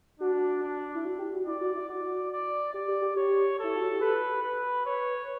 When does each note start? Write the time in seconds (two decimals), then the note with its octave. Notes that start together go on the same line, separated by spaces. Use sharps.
0.20 D4 F#4
0.62 D4
0.95 E4
1.05 F#4
1.19 G4
1.33 F#4
1.46 E4 D5
1.61 F#4
1.75 E4
1.89 F#4 D5
2.31 D5
2.73 G4 D5
2.88 G4
3.02 G4
3.16 G4 C#5
3.59 E4 A4
3.76 F#4
3.88 G4
4.01 A4 B4
4.43 B4
4.86 B4 C#5